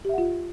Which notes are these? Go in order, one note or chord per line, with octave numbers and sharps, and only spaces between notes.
F4 G4 E5 F#5